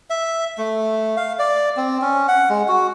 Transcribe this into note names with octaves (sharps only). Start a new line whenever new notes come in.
E5
A3
F5
D5
C4
C#4
F#5
G#3
F#4